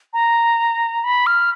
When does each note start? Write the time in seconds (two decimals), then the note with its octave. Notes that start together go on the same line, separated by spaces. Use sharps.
0.13 A#5
1.04 B5
1.27 F6